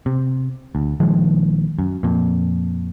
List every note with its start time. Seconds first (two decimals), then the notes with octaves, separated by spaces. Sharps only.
0.06 C3
0.75 D2
1.00 A#1 D#3 F3 G#3
1.79 F#2
2.03 F2 A#2